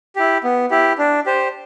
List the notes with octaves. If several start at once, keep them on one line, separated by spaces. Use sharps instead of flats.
E4 G4
B3
E4 G4
D4
G4 C5